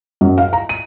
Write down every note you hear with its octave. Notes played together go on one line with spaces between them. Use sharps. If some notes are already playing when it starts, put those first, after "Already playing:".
F#2
F5
A#5
D#7